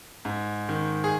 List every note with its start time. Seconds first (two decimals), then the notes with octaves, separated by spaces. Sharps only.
0.25 G#2
0.69 D#3
1.04 G#4